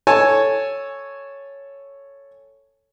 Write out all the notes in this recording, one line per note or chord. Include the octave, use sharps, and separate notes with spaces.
A4 C#5 G#5 A5